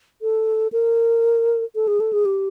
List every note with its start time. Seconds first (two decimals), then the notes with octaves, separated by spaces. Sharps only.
0.22 A4
0.72 A#4
1.75 A4
1.88 G#4
2.00 A4
2.13 G#4
2.25 G4